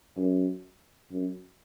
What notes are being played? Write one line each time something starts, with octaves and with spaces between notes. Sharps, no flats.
F#2
F#2